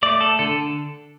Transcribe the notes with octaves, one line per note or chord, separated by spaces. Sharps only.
A3 D5
A4
D3 A4